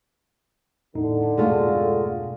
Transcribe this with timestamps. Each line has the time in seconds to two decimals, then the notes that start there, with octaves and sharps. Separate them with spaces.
0.95 E2 A2 D3 D#4
1.37 F2 G#2 B2 G#3 A3 F4